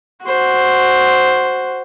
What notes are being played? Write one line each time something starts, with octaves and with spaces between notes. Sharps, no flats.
F#4 C5